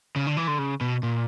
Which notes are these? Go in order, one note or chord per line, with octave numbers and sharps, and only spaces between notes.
C#3
D3
E3
D3
C#3
B2
A#2